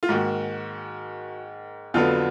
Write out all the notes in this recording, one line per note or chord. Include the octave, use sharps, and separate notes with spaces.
F4
G#2 D#3 A#3 F#4
F2 D3 F#3 B3 F4